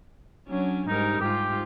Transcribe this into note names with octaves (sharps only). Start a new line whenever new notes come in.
F#3 C#4 D4
G#2 G3 D#4 A#4
G#2 F4 G4